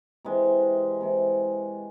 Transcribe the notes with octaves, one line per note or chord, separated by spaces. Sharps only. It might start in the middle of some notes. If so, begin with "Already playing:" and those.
C3 E3 G#3
C3 E3 G#3